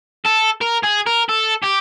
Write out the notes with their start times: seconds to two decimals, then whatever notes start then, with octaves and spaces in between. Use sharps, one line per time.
0.26 A4
0.61 A#4
0.83 G#4
1.06 A#4
1.29 A4
1.64 G4